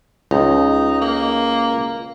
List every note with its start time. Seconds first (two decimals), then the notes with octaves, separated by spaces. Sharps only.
0.31 C#2 D#4
1.01 A#3